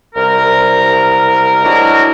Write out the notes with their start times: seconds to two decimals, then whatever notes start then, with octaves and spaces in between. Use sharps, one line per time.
0.15 C2 A#4
1.64 F#3 G#3 D4 E4 F#4 A#4